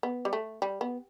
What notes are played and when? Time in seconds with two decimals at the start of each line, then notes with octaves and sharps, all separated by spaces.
0.03 B3
0.25 G3
0.33 A3
0.62 G3
0.81 B3